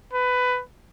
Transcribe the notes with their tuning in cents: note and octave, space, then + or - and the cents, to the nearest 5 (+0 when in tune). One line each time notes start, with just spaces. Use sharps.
B4 +15